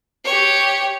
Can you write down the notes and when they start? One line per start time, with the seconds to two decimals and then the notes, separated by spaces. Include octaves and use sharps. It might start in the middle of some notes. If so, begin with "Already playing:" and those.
0.25 G4 C#5